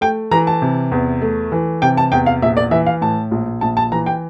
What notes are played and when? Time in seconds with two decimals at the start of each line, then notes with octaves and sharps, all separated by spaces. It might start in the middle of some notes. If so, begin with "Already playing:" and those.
0.01 A3 G5
0.31 E3 A#5
0.47 A5
0.62 C3
0.92 E2
1.22 A3
1.52 E3
1.82 C3 G5
1.97 A5
2.12 E2 G5
2.26 F5
2.42 A#1 E5
2.57 D5
2.71 E3 E5
2.86 F5
3.01 A2 A5
3.31 A#1
3.61 A#1 A5
3.77 A5
3.92 E3 A#5
4.06 G5